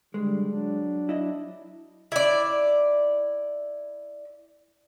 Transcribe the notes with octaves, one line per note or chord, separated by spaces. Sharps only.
D3 G3 G#3
F#3 D4
E4 D#5
E4 D5